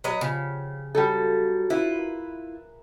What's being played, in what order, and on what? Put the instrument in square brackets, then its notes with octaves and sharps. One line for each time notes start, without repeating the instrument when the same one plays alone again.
[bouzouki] F#3 B4 D#5
[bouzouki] C#3 [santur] F3 G4 F#5
[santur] F#3 F#4 [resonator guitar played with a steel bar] G3 A4
[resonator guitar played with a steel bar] E4 F4 [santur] G#4 [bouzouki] B4
[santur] A#4 E5 F5